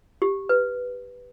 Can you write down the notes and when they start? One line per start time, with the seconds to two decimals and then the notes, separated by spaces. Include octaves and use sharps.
0.22 G4
0.49 B4